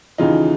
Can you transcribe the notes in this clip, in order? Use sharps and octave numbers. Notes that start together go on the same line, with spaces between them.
D#2 C#3 E3 D#4 F4